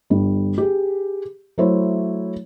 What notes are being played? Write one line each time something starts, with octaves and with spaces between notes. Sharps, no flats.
G1 G3
G4 G#4
F#3 A3 E4 C5 C#5